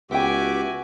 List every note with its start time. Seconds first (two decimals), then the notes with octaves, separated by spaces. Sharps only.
0.11 C#2 B3 F#4 G4 E5 G5 G#5 D6